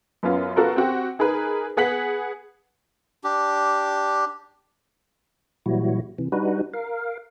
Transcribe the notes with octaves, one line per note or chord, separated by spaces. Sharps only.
F#2 B3 C#4 F4
B3 F4 F#4 A4 A#4
C4 F#4 G4
D#4 G#4 A#4 B4
B3 G#4 F#5 B6 F#7
D4 G4
A#2 E3 F#3 G3 E4 F#4
C3 E3
G3 D4 D#4 F#4 B4
A#4 F5